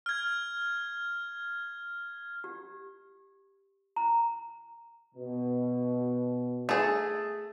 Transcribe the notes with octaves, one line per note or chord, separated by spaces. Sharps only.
F6 G#6
G4
A#5
B2
A3 G#4